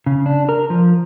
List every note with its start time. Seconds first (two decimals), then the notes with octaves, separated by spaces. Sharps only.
0.06 C#3
0.26 D4
0.49 A#4
0.70 F3